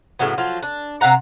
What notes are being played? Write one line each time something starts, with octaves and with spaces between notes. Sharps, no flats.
A2 C#3 F#3 B3
F3 F#3 F4
D4
C3 F5 F#5 A#5